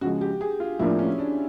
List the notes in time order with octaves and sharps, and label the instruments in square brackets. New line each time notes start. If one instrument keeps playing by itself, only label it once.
[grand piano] C#3 F3 G#3 [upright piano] F#4
[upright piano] G4
G#4
F4
[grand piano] A2 F3 A#3 D4 F4 [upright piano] E4
[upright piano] C#4
D4